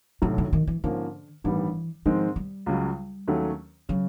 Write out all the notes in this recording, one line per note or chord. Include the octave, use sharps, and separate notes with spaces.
B1 A2 C3 F#3 A3
D3
D#3
E3
G#2 D3 F3 A#3 C#4
A1 G2 D#3 E3 G3 B3
G#2 D#3 F3 G#3 C4
G3
C#2 C#3 F#3
D#2 D#3 F#3 A3 C#4
C#3 F#3